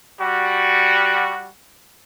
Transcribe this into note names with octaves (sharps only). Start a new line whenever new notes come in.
G3 F#4